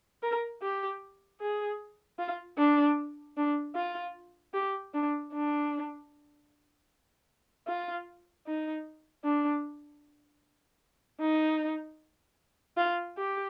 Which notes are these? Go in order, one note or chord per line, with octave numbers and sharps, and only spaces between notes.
A#4
G4
G#4
F4
D4
D4
F4
G4
D4
D4
F4
D#4
D4
D#4
F4
G4